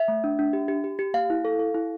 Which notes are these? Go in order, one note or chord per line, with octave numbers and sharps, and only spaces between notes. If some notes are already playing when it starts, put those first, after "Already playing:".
Already playing: E5
A3
D4
D4
G4
G4
G4
G4
A#3 F5
E4
A4
A4
E4